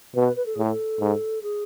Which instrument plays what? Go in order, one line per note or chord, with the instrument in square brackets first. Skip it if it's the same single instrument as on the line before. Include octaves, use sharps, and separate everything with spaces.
[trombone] B2 [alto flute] B4
[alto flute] B4
A4
[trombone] A2 [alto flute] G#4
[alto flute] A4
[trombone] G#2
[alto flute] G#4